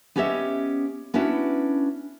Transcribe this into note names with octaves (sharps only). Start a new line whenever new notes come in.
B3 C#4 G4 C#5 D#5 E5
B3 C#4 D4 E4 F#4